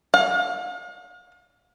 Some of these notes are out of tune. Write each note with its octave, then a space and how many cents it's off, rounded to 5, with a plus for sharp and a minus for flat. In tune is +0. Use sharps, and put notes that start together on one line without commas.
F5 +45